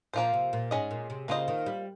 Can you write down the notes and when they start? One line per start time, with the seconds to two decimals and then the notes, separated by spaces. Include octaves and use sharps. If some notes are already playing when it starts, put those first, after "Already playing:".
0.13 A#2 F3 A#3 F4 C5
0.33 C3
0.53 A#2
0.71 G#2 G#3 C#4 G#4 D#5
0.91 A#2
1.10 C3
1.28 C#3 A#3 F4 C5 D#5
1.48 D#3
1.66 G3